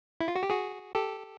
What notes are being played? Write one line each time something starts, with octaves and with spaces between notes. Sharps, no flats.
E4
F4
F#4
G4
F#4 G#4
G4 A4